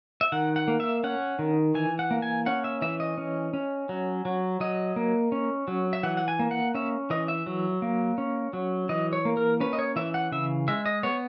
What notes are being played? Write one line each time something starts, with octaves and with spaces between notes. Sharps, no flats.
E5
D#3 F#5
F#5
A#3
E5
C#4 F#5
D#3
E3 G#5
F#5
A#3
G#5
C#4 F#5
E5
E3 E5
D#5
C#4
C#4
F#3
F#3
F#3 D#5
A#3
C#4
F#3
E5
E3 F#5
F#5
G#5
A#3
F#5
C#4 E5
E3 D#5
E5
F#3
A#3
C#4
F#3
E3 D#5
C#5
A#3
A#4
C#4 B4
D#5
C#5
E3 E5
F#5
C#3 E5
G#3 E5
D#5
B3 C#5